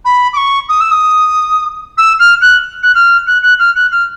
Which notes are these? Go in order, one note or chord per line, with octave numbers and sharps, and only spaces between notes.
B5
D6
C#6
D#6
E6
D#6
E6
F6
F#6
F#6
F6
F#6
F#6
F6
F#6
F6